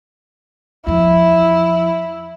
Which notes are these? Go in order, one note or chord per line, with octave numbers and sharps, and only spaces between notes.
E2 F3 E4